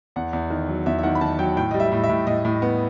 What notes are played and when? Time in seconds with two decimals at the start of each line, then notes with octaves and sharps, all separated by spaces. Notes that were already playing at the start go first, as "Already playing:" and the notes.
0.16 E2 F#5
0.33 E2
0.50 D#3
0.69 F#3
0.86 E2 E5
0.99 E5
1.03 D#3 F#5
1.15 B5
1.21 D#3 A5
1.39 F#3 G5
1.57 A2 G5
1.71 G3 D#5
1.80 E5
1.92 A2
2.04 E5
2.09 A2
2.27 A2 D#5
2.45 A2
2.62 B3